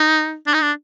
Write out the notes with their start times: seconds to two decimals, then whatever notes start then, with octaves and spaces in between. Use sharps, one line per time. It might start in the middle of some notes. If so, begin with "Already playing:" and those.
Already playing: D#4
0.47 D4
0.54 D#4
0.61 D4